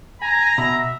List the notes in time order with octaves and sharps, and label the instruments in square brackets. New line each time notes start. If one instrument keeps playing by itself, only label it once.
[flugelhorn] G#5 [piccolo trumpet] A#5 [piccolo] A#6
[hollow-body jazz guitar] B2 B5 [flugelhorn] E5